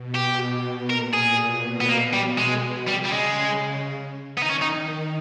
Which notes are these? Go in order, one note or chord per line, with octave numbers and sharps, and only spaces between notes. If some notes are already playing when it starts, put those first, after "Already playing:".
Already playing: B2
G4
B2
A#2 A#4
G#4
B2
B3
A#3
G3
G#3
C#3 G3
G3
G#3
D#3 B3
D#4
C#4
D#4